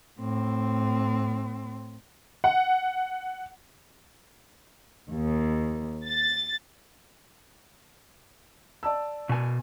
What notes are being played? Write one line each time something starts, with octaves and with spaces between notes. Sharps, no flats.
A2 C4
F#5
D#2
A6
D5 A5 E6
B2 G#5